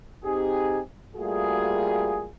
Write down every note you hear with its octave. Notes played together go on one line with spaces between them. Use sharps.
C4 D#4 G4 G#4
G3 A3 A#3 F4 F#4 G#4